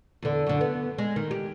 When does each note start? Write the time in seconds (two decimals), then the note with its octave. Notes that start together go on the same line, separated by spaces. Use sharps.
0.22 E2 D3
0.47 F#2 D3
0.61 B3
0.98 G#3
1.16 D#3
1.31 G4